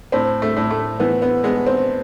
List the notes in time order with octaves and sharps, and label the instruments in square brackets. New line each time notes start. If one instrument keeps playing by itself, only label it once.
[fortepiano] A2 C4
A3
A2
A3
E3 B3
B3
G#3 B3
C4